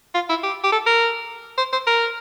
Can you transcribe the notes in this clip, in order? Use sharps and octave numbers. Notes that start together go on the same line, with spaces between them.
F4
E4
G4
G4
A4
A#4
C5
C5
A#4